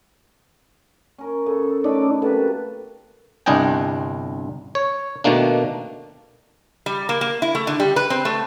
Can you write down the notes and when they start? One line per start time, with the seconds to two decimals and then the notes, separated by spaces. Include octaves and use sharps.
1.18 C#4 A#4
1.46 C#3 A4
1.84 A3 C#4 D#4 B4 D5 B5
2.22 C3 F#3 A#3 A4 B4
3.46 G1 C2 D4 D#5 G5 G#5
4.75 C#5
5.24 B2 D#3 A3 A#3 D4
6.86 G3
7.09 A#3
7.21 A#3
7.42 E4
7.55 A3
7.67 D3
7.80 G3
7.96 B4
8.10 C4
8.25 A3